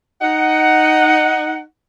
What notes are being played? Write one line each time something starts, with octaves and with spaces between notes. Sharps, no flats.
D#4 F#5